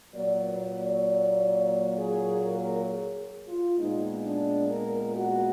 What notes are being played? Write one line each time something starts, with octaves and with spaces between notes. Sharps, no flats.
A#2 F#3 A#3 D5
B4
D5
G#4
A#4
G#4
F4
A#2 G#3 B3 D#4
D4
A#4
F#4